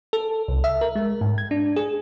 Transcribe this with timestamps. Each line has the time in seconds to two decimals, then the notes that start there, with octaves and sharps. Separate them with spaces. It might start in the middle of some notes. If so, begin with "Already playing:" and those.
0.13 A4
0.48 C2
0.64 E5
0.81 A#4
0.96 G#3
1.21 G#2
1.38 G#6
1.51 D4
1.76 G#4